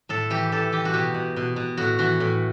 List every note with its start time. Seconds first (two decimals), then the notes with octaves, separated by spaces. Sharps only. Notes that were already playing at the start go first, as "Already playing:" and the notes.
0.09 A2 A4
0.30 E3 G4
0.52 A2 A4
0.72 E3 G4
0.85 F#4
0.94 B2 G4
1.14 B2
1.36 B2
1.56 B2
1.77 A2 F#4
1.99 E3 F#4
2.20 A2